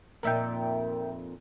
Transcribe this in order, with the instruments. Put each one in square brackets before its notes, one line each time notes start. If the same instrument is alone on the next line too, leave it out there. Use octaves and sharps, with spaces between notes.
[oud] F2 A#2 D#4 [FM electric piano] A#4 E5 G5